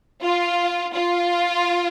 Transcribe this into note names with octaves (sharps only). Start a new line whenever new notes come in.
F4
F4